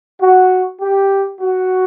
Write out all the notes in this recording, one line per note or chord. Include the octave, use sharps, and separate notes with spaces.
F#4
G4
F#4